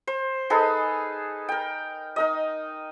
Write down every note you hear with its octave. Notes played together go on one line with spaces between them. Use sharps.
C5
D#4 G#4 A4 B4
A#4 G5
D#4 A#4 D#5